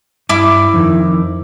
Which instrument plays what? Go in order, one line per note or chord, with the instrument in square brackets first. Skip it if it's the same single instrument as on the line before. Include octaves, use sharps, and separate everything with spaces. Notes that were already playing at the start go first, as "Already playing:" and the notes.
[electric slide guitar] G2 [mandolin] E4 D6
[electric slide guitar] F2 D#3